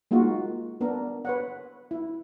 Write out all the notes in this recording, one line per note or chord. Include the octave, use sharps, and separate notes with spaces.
G#3 A#3 D#4 F4 F#4
B3 D4 A#4
B4 C#5 F#5
E4